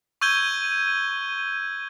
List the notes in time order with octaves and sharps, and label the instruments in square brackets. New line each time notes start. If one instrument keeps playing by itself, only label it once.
[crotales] C#6 E6 G6 G#6 D#7 G7